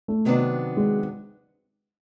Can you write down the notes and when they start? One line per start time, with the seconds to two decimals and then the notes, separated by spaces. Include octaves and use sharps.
0.08 A3
0.25 C3 D#3 F#3 B3 D4
0.77 G#3